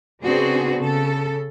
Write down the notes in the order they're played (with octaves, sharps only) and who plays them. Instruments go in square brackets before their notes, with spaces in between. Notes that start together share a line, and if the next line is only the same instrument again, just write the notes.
[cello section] C#3 B3 C4 D4 F#4 G#4
C#3 A4